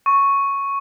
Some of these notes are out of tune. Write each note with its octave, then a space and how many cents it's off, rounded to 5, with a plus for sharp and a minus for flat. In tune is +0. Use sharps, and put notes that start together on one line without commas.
C#6 +0